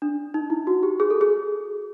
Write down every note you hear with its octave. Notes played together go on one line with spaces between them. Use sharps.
D4
D#4
E4
F#4
G4
G#4
A4
G#4